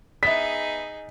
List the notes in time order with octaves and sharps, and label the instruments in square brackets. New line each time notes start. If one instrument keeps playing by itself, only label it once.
[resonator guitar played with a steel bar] B3 E5 [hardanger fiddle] D#4 G#4 [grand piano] B6